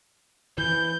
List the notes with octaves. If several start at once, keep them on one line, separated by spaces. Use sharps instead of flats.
E3 G6